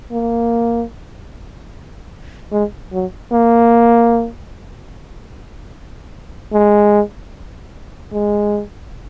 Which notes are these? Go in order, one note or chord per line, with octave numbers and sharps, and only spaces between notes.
A#3
G#3
F#3
A#3
G#3
G#3